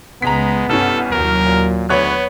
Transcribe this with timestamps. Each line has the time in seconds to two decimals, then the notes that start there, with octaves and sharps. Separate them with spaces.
0.22 C#2 G#3 B3 A#5 B6
0.69 C2 G2 C#4 A4
1.11 D#2 F#3 A#4
1.46 A#2
1.89 D2 B3 B4 C#5 F#6